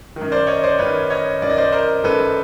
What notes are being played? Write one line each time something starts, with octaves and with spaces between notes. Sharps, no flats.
D#3
F#2
C5 D5
C#5 D#5
C5 D5
F#2 D#3 B4 C#5
C#5 D#5
F#2 D#3 D5
D#5
C5 D5
A#4 C5
F#2 D#3 A4 B4